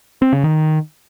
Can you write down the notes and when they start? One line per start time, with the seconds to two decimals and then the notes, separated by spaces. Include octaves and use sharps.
0.22 C4
0.33 C#3
0.43 D#3